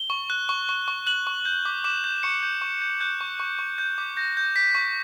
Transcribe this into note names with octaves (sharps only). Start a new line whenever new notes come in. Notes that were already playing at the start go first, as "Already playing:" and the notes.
Already playing: G7
C#6
F#6
C#6
C#6
C#6
F#6 F#7
C#6
G6
D6
D6 E7
G6
C#6 C#7
G6
C#6
G6
F#6 G6
C#6
C#6
C#6
G6
D6
G6 A#6
G6
G6 B6
C#6